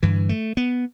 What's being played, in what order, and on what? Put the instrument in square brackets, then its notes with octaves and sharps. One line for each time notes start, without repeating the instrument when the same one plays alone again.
[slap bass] G2 D3 E3
A3
B3